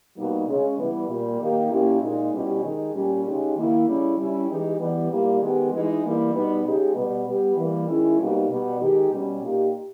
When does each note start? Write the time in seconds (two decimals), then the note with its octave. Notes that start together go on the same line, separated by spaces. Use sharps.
0.17 B2 G3 A#3 D#4
0.47 C#3 G#3 C#4
0.79 E3 G3 B3
1.09 A#2 G3 A#3
1.40 D#3 A#3 D#4 G4
1.70 A#2 A#3 C#4 E4 G4
2.02 A#2 G#3 D#4
2.33 B2 G3 C#4 E4 G4
2.63 D#3 G#3 D#4 G4
2.94 A#2 G3 C#4 G4
3.25 C#3 G#3 D#4 G4
3.55 D#3 A#3 E4
3.87 C#3 G3 C#4 E4
4.18 G3 C#4 E4
4.49 E3 G#3 D#4 G4
4.79 E3 G3 B3
5.11 A#2 G3 A#3 E4 G4
5.41 D#3 G#3 B3 G4
5.72 E3 G#3 D#4
6.03 E3 G3 A#3 E4
6.34 B2 G3 B3 D#4
6.64 C#3 G#3 D#4 G4
6.95 B2 G3 B3
7.26 G3 B3 G4
7.57 E3 G3 A#3
7.88 D#3 G#3 C#4 E4
8.18 B2 G3 A#3 D#4 G4
8.49 B2 G3 B3
8.80 D#3 G#3 D#4 G4
9.11 B2 G3 C#4 G4
9.42 A#2 A#3 D#4 G4